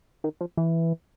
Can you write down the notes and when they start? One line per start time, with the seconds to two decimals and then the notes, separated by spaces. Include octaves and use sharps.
0.24 D#3
0.41 F3
0.57 E3